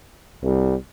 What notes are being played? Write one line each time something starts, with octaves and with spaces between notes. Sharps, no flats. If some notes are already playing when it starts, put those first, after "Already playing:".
C2